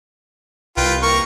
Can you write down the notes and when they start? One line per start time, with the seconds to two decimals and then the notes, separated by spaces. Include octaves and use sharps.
0.77 C2 F4 B4 G5
1.02 A#3 A#4 C#6